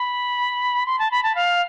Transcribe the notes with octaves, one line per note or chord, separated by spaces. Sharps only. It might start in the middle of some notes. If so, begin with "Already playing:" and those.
Already playing: B5
C6
A5
B5
A5
F5